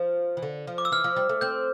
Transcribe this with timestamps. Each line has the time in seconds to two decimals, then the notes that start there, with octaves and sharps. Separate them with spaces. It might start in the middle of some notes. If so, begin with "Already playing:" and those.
Already playing: F3
0.37 E3
0.42 D3
0.67 F3
0.78 D6
0.85 E6
0.92 E3 F6
1.04 F3
1.16 G3
1.29 A3
1.41 C4 G6